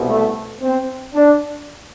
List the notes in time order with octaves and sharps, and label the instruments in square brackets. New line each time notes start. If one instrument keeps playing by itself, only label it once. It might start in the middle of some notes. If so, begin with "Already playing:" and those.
Already playing: [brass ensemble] C2 B2
A3
C4
D4